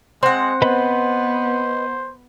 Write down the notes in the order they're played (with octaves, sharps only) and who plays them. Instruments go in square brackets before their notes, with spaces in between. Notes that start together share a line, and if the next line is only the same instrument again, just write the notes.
[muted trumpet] G#3 [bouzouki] C4 F#5
[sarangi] B3 [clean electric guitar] B4 D#5 B5 [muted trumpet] C5